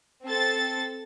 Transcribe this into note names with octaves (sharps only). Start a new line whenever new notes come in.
C4 A4 A6